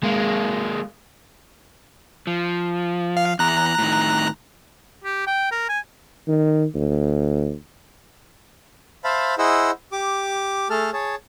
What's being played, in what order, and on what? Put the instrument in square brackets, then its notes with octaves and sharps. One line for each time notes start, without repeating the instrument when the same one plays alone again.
[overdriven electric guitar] G#3 A#3
[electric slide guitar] F3
[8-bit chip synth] F5
[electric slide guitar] E2 [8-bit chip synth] A#5 F#6
[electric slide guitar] A2 D#3
[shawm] G4
G5
A#4
G#5
[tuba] D#3
D2
[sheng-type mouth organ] C5 E5 F5 A5 B5
E4 G#4 C5 D#5 F#5 E6
G4 D6
A3 G#4 A4 A5 F6
G#4 C#5 A5